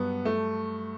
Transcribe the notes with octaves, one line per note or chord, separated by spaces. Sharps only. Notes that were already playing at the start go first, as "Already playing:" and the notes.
Already playing: G2 F#3 B3
A3